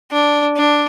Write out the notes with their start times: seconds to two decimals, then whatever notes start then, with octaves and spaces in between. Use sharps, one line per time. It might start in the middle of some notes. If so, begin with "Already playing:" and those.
0.12 D4
0.56 D4